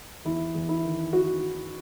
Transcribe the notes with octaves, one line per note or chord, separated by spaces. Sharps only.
E2 E4
E2
E4
D#3
D#3 F#4